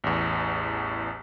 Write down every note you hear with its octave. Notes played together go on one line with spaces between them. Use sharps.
A1 E2